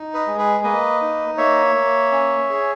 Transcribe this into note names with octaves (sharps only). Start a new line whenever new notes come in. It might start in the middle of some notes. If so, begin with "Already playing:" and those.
Already playing: D#4
B4 D#5
G#3
G#4 B4
A#3 B4 D#5
D#4
A#3 C#5 E5
A#3
C#4
G#4